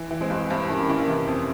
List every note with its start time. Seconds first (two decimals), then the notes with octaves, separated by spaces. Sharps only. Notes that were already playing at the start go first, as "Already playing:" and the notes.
Already playing: E3
0.11 E3
0.21 G#3 C4
0.30 G2
0.49 G2 C4 E4
0.69 E3 A#3 C#4
0.89 E3 A#3 C#4
1.08 C3
1.27 F2